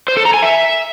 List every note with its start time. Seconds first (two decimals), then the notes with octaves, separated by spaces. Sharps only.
0.08 C5
0.17 A4
0.25 A#5
0.34 G#5
0.42 E5